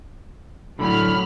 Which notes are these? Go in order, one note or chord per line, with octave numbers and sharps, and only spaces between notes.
A2 D3 F#3 B5 F6